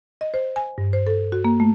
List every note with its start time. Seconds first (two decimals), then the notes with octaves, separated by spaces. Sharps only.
0.21 D#5
0.34 C5
0.56 G#5
0.78 G2
0.93 C5
1.07 A4
1.32 F#4
1.45 A#3
1.60 A3